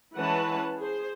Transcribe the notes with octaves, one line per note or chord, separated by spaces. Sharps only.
E3 G#3 C#4 B4 F#5 A5
G#4 C5